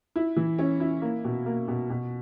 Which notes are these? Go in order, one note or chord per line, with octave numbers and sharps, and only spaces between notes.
E4
E3
C#4
E4
A#3
B2
A#3
B2
B2